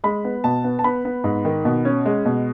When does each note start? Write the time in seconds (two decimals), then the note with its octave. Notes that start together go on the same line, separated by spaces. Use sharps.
0.04 G#3 B5
0.25 B3
0.44 B2 A5
0.64 B3
0.79 A5
0.84 B3 B5
1.05 B3
1.24 G#2
1.45 D#3
1.65 B2
1.85 C#4
2.06 G#3
2.25 B2